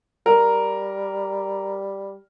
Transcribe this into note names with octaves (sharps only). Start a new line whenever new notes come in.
G3 A#4